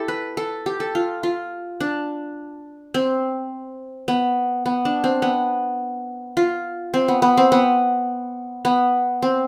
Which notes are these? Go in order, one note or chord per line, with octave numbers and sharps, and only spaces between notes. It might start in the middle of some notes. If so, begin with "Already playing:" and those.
Already playing: E4 G4 A4
B4
A4
G4
A4
F4
F4
D4
C4
B3
B3
D4
C4
B3
F4
C4
B3
B3
C4
B3
B3
C4